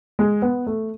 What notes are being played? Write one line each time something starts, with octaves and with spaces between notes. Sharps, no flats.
G#3
B3
A3